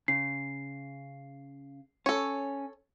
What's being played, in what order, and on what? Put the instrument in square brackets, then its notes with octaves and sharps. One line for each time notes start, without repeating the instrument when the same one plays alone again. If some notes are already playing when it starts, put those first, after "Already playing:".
[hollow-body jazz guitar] C#3 [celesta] C7
[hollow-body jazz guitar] C#4 [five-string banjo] A4 C#5